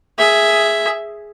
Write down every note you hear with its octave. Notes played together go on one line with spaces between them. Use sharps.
G#4 E5